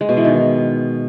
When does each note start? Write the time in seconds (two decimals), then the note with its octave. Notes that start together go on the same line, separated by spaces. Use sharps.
0.01 G#3
0.09 B2
0.17 E3
0.25 D#3